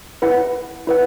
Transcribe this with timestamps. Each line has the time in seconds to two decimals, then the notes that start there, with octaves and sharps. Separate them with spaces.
0.22 E4 B4 F#5
0.87 E4 B4 F#5